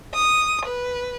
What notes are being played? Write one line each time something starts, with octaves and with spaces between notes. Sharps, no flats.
D#6
B4